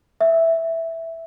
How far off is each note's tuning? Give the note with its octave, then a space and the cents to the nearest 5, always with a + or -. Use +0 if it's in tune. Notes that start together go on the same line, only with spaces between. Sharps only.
E5 +0